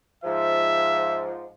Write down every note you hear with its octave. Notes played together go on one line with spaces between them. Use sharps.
G#2 F3 E5